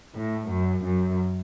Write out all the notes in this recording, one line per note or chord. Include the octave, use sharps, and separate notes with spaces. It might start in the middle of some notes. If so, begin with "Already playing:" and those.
A2
F#2
F#2